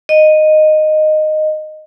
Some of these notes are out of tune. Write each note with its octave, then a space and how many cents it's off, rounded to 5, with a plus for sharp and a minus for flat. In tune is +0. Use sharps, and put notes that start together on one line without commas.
D#5 -10